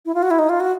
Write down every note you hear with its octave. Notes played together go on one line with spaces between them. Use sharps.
E4
F4
F#4
E4
D#4
F4
F#4